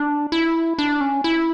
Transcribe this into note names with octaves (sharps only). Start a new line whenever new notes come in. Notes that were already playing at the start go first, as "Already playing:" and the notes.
Already playing: D4
E4
D4
C#4
E4